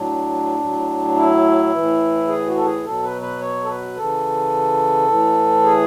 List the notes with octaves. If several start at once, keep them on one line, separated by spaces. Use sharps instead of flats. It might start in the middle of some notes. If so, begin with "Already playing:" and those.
Already playing: A2 F#3 D4
A2 F#3
E4
A2 E3
G#4
F#4
A4
G#4
B2 F#3 A4
B4
B4
C#5
A4
B4
C#3 E3 A4
A2 E3
G#4